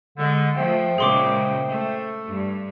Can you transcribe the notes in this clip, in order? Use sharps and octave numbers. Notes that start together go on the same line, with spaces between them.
D3 G#3
F3 A3 C5 E5 G5
A#2 C#3 G#3 G#4 C6 D6
A3
G2